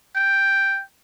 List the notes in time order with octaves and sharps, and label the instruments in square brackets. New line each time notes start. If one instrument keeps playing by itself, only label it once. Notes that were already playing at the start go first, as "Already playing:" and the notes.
[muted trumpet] G5